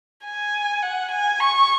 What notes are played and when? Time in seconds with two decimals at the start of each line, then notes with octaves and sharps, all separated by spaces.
0.25 G#5
0.82 F#5
1.11 G#5
1.40 C#6